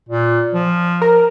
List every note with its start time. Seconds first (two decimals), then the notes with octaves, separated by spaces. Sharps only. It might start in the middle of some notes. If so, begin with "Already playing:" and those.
0.09 A#2
0.54 F3
1.02 A#4